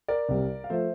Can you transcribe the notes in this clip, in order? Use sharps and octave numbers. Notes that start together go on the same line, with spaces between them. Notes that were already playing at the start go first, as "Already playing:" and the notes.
A#4 D5
C2 C3 G3
F5
F3 A3 C5 E5